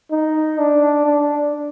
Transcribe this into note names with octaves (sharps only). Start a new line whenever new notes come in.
D#4
D4
D4